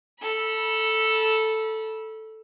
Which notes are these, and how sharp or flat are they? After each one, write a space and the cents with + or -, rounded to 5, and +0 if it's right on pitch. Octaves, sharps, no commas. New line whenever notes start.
A4 +0 B5 -30